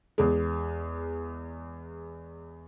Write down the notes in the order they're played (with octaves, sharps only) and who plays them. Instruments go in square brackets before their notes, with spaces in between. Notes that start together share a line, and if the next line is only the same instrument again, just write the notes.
[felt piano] E2 G#3